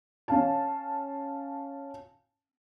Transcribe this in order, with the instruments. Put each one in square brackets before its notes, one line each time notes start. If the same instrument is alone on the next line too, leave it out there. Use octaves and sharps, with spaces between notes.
[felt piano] C#4 F5 A5